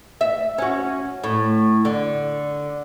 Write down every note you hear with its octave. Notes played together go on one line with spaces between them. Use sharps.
E5
C#4 F#4
A2
D3